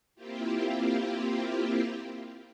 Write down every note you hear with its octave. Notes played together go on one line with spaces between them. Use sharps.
A#3 C4 E4 F4 G4